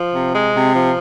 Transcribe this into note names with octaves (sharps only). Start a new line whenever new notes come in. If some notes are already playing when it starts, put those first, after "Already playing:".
Already playing: F3
C3
G#3
C3
F3